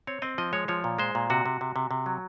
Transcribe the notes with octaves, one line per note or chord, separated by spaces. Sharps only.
C4 C#5
C4 D#5
F3 D#5
G#3 C#5
F3 C#5
A#2
G#3 C5
A#2
C3 F#4
C3
C3
C3
C3
F#3